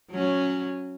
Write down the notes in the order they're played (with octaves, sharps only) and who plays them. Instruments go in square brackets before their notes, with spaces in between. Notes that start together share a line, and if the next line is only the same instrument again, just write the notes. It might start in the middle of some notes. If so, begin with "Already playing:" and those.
[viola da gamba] F#3 C#4